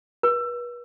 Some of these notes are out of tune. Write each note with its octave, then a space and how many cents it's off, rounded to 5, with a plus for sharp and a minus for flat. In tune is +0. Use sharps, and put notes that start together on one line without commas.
B4 -40